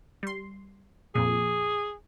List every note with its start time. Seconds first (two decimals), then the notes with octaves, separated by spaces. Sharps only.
0.23 G3 C6
1.15 F2 A#2 G#4